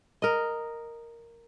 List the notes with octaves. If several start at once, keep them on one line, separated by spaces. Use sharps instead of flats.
A#4 D#5